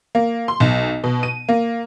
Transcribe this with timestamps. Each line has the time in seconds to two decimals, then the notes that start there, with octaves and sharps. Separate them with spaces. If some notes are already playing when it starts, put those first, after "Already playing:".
0.15 A#3
0.48 C6
0.60 B1
1.04 B2
1.23 D#7
1.49 A#3